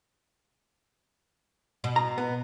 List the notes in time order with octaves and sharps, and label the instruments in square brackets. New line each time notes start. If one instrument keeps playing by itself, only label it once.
[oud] B2
[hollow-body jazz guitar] A#5
B3